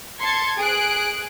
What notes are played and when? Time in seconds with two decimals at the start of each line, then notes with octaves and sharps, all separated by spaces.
0.22 A5 C6 G#6 C#7
0.60 G#4 F#6 D7